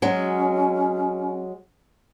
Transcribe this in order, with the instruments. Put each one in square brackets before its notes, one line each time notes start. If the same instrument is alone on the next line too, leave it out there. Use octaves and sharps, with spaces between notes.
[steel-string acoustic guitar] F#3 G#3 [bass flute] C#4